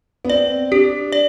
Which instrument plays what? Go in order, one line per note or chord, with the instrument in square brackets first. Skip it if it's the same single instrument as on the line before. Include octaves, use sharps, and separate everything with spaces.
[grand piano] B3
[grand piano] C4 [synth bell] D5
[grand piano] D4 [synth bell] G4
[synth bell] D5